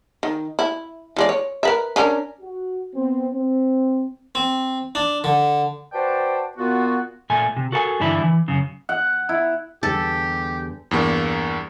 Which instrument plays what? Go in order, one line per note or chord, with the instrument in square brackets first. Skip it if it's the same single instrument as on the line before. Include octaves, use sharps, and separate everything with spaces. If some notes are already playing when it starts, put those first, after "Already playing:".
[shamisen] D#3
E4
E3 G#3 D5
C#5
A#4 B4 E5
C#4 D4 A#4
[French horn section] F#4
B3 C4
C4
[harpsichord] C4
D4
D3
[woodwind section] F#4 B4 C5 D5 G5 A5
A#2 B3 F4 F#4
[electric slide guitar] A#2 A3 G#5
C3
F#4 A4 A#4 F#5 G#5
G2 D3 E3 E4 G#5
E3
F#2 C#3
[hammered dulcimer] F#5
E4
[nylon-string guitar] E2 D3 G3 [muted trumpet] G4 [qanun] A4
[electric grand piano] E2 G2 A#3